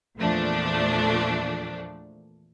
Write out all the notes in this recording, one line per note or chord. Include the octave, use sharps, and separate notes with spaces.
E2 A#2 F3 A3 D4